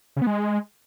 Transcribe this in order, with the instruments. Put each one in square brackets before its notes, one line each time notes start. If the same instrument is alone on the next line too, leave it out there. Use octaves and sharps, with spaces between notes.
[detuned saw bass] C#3
B3
G#3